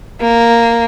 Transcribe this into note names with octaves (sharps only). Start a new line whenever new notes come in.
A#3